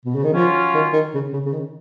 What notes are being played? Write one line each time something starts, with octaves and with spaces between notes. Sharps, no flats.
B2
C#3
D#3
F3 F#3 C#4 F4
D#3
D#3
C#3
C#3
C#3
D#3